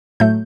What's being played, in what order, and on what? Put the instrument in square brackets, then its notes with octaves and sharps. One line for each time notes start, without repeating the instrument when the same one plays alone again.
[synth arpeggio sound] A2 F#3 A3 G6